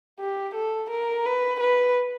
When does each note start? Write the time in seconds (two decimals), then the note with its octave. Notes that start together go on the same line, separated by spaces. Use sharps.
0.19 G4
0.55 A4
0.90 A#4
1.25 B4
1.60 B4